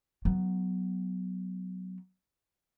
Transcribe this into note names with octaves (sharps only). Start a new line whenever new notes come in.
F#3 B3